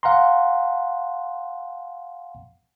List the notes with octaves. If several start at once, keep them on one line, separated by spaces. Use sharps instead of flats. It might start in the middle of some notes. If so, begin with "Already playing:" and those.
F5 F#5 G#5 A#5 C6